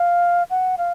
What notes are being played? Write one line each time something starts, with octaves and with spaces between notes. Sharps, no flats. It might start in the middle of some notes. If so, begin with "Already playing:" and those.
Already playing: F5
F#5
F5